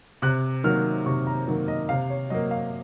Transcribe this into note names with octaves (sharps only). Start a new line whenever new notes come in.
C3 F#6
D#3 F#3 A#3 F6
C3 C#6
A#5
D#3 F#3 A#3
D#5
C3 F5
C#5
F#3 A#3 D#5
F5